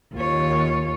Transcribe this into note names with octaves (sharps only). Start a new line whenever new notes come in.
D#2 F4 C#5